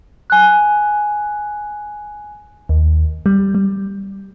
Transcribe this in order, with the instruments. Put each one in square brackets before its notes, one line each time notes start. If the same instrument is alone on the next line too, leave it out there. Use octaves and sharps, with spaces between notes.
[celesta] G#5 F#6
[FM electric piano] D#2
G3
G3